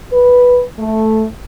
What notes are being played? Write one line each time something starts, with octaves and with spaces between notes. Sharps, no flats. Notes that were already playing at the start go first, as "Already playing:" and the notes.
B4
A3